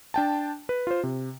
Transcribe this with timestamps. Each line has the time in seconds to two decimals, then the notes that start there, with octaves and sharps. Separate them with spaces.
0.14 D4 G5 A5
0.69 B4
0.87 F4 C5
1.03 C3